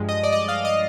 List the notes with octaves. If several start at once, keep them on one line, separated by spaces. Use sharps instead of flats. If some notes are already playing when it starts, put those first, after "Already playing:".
Already playing: G2 F3 G#3
D#5
D5
D#5
F5
D#5